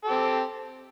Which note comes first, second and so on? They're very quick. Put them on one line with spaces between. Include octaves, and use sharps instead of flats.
A4 G4 C4